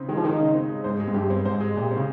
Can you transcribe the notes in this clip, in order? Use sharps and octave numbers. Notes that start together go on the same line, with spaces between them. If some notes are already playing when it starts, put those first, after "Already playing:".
Already playing: C#3 C4 D#4
D#3 G#3
F3
D#3 D#4
C#3
C4
G#3
G#2 C5
G#3
G#2
G2 G4
C4
G#2 C5
G#3
A#2 G4
C4
C#3